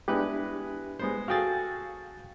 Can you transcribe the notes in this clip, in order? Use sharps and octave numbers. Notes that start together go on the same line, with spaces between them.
G#3 B3 D4 E4 G4 B4
G#3 B3 C5
F#4 G#4 A4 F5 G5 A6